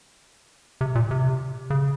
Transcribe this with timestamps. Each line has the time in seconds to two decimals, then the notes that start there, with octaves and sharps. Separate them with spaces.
0.81 C3
0.95 A#2
1.11 C3
1.70 C#3